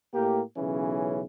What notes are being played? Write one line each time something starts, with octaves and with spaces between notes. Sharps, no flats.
A2 A#3 G4
B1 C#3 E3 C#4